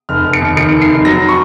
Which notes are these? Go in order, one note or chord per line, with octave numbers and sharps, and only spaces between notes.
F1 F6
F1
C#7
D#2
D#3 C#7
F1
C7
F1
F#3 A#6
C#6